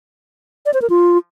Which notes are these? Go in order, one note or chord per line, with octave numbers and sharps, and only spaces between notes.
D5
C5
A#4
F4